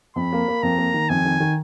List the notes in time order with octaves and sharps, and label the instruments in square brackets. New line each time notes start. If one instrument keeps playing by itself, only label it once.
[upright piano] F2 [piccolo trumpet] B5
[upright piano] A#3
A#3
[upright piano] F2 [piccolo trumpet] A#5
[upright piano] A#3
D#3
[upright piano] F2 [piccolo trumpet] G#5
[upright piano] D#3
D#3